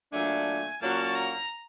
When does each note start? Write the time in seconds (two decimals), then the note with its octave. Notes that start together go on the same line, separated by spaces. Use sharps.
0.13 A#2 F#3 A3 D4 G#5
0.81 A#2 F#3 A#3 C#4 F#4 A5
1.15 A#5